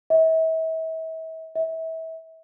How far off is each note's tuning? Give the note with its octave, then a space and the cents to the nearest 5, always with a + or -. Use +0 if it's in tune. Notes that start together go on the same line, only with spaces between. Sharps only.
E5 -40
E5 -30